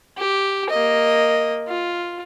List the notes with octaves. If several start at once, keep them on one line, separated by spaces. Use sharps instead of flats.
G4
A#3 D#5
F4